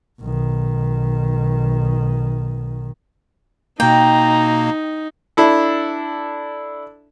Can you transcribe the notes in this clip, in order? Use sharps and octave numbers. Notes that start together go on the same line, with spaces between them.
B1 D#3
B2 A#3 D#4 G5 A#5
D4 E4 A4